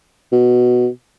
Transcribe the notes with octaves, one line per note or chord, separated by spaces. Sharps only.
B2